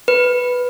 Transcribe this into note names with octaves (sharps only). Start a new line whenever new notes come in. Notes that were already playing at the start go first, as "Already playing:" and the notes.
B4